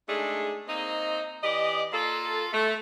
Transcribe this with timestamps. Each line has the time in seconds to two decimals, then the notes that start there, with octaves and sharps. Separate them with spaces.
0.07 G#3 A3 D4 D#4 G#4
0.67 A#3 C4 D#4 D#5
1.42 E3 G4 D5 D#5
1.93 A#3 F4 A4
2.52 A3